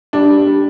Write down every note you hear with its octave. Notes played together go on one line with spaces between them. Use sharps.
G3 D4
G3
G3